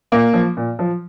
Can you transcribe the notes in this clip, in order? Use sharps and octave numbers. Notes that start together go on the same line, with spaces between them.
A#2 A#3
F3
A#2
F3